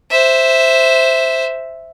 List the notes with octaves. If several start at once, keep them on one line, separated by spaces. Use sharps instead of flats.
C5 E5